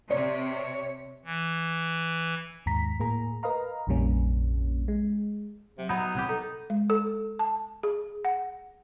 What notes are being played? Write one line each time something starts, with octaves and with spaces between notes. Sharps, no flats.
C3 C#5 D5
E3
D#2 G#2 A#5 B6
A2 A#3 G#4 A#5
A#4 B4 D#5 F5 A#5
A#1 F2 C3 G3 A#3 C#4
G#3
C3 F#3
F#3 B3 D#4 B5
C2 F#3 G4
D#4 A4
G#3
A4
A5
G#4
F#5